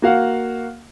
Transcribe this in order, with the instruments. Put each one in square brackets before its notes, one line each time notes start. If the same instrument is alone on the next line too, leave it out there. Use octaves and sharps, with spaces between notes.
[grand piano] A#3 F#4 F5 F#5